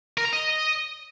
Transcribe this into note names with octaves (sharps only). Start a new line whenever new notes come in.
A#4
A#5
D#5